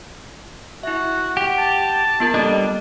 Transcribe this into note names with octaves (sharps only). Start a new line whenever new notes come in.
E4 F#4 E5
G4 F#5
A5
B3 F4 A#4
G3 A#3 D4 A4 D#5